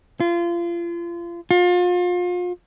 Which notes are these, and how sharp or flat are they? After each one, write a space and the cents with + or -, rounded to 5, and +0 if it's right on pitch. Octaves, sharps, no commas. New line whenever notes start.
F4 -30
F4 +35